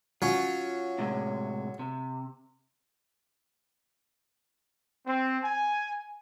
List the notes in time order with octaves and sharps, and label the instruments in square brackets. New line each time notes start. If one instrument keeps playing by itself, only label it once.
[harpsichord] F#3 C#4 [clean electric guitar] F4
[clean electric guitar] A2 C3 G#3
C3
[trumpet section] C4
G#5